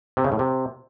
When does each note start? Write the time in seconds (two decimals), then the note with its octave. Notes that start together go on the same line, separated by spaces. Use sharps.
0.17 C3
0.24 C#3
0.32 A2
0.39 C3